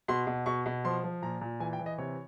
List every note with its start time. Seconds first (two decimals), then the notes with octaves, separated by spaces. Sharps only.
0.08 B2 C6
0.27 B2
0.46 B2 C#6
0.66 B2
0.84 F3 C6
1.03 F3
1.22 A#2 A#5
1.41 A#2
1.60 E3 G#5
1.73 G5
1.79 E3
1.86 D#5
1.98 C3 C#5